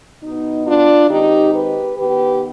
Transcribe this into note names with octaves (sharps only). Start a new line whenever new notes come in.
B2 B3 D#4
D4 F4
D#3 G#3 C4 D#4 G4
G4 B4
D#3 B3 G4 B4